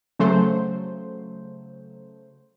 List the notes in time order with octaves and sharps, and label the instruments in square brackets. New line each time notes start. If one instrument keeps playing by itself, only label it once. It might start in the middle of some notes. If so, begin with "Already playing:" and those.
[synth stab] C#3 F#3 A3 C5